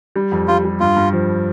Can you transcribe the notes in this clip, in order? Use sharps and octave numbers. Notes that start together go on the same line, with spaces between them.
G3
F2
G3 F4
G3
G2 F4
G2
F3